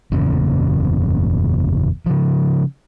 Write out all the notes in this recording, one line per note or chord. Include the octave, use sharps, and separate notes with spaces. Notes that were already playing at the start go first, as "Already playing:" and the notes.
F#1 E2 A#2 C#3
C#3 F3